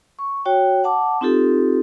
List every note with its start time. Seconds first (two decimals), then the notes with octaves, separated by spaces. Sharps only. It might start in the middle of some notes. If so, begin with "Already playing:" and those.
0.19 C#6
0.45 F#4 C#5 G5
0.84 F#5 A5 D6
1.21 C4 D#4 F4 G4 A4